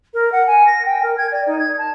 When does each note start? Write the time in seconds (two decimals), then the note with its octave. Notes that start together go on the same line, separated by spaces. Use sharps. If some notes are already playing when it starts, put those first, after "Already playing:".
0.14 A#4
0.32 F#5
0.47 G#5
0.66 A#6
0.85 G5
1.02 A#4
1.17 G#6
1.31 D5
1.46 D#4
1.58 G#6
1.78 A5